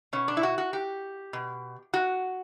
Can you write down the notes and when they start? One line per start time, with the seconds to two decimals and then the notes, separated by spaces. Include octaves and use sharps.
0.13 B2 C#4
0.28 D4
0.37 E4
0.43 F#4
0.58 F#4
0.73 G4
1.33 B2
1.94 F#4